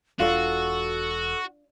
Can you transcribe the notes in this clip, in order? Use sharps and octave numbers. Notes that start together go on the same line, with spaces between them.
E1 D4 F4 F#4 A4